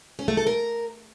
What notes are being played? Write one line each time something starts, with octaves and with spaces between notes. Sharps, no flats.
C#4
A3
A4
A#4